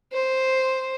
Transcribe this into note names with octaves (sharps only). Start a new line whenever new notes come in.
C5